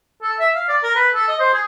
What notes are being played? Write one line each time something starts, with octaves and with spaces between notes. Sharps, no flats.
A4
E5
F5
D5
A#4
B4
A4
D#5
C5
G#4